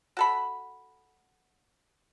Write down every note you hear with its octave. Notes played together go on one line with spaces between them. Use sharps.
F#4 A4 B5